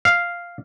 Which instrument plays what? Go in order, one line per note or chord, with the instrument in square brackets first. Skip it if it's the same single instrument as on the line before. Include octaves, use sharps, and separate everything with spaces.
[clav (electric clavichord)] F5